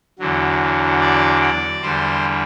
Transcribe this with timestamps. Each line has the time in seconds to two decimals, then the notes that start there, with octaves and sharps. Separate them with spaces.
0.19 E2 D3 F#3
1.01 D5
1.41 D5
1.82 E2 D3 G3 C5